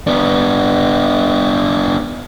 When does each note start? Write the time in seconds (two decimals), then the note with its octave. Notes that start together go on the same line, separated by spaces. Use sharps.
0.07 B3 D4